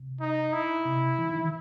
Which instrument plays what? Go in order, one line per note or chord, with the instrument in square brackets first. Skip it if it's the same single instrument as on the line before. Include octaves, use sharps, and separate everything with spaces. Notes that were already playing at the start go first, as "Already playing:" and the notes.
Already playing: [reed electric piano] C3
[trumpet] D#4
E4
[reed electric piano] C3
E3
D#3
E3